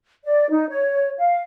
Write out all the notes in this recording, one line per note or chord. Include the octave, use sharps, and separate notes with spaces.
D5
D#4
C#5
F5